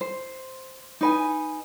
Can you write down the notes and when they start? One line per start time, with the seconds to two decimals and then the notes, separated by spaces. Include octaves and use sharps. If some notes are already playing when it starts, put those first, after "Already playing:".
0.01 C5
1.01 D#4 B4 G#5